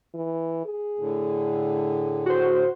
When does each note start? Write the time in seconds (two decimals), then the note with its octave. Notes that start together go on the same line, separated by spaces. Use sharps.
0.15 E3
0.66 G#4
0.99 A2 D3
2.26 F#4 C5